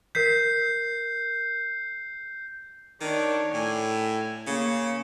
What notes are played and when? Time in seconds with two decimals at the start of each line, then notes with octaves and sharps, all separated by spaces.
0.15 A#4 G6 B6 C7
3.01 D#3 D4 C#5
3.54 A2 G#5
4.47 C#3 A#3